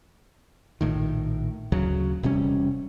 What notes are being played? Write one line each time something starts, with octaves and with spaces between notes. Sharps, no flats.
A#1 A2 D#3
D2 C#3 F#3
E1 C3 G3 C#4